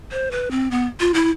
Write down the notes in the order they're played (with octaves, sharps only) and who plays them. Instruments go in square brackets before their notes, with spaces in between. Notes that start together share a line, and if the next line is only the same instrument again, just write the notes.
[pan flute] C5
B4
C4
B3
F4
E4